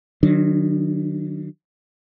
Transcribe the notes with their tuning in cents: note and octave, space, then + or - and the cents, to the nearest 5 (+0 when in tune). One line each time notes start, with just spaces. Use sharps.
D#3 -30 F#3 +0 D4 +0